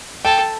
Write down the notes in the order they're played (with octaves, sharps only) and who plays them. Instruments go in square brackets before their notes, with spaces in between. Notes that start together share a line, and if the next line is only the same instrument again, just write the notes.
[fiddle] A4 [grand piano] G5